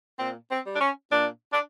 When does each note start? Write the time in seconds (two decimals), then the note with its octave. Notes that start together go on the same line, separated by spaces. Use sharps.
0.19 A#2 C4
0.50 C4
0.66 G3
0.76 D4
0.81 C#4
1.12 A#2 D4
1.52 D4